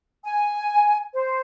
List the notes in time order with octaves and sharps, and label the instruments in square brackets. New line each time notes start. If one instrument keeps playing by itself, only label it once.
[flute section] G#5
C5